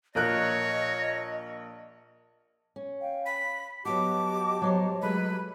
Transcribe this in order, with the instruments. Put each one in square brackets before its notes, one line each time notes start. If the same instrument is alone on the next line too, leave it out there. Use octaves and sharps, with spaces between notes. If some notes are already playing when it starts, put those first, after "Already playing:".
[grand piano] A#1 A#4 F#6 [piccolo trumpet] C#5 [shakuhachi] D#5 [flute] A#6
[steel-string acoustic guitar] C#4
[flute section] F5 G5
[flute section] B5 [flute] B6
[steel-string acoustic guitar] F#3 B3 F#4 [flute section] G4 D#5 A5 [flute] D6
[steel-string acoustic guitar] F#3 C5 C#5
[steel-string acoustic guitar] F#3 G#3 A3 [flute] B4